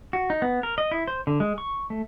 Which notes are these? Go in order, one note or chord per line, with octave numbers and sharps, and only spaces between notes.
F#4
D#4
B3
A#4
D#5
E4
C5
D3
G#3
C#6
A3